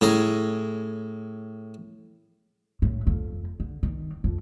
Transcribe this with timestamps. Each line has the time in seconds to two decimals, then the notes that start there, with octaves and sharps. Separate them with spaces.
0.01 A2 C#4 G#4 A#5
2.82 A2
3.07 F2
3.60 D3
3.83 D#3
4.24 F2